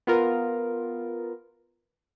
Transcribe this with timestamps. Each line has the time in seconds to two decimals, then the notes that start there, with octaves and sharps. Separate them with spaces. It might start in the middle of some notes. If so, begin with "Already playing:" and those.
0.07 B3 F4 A#4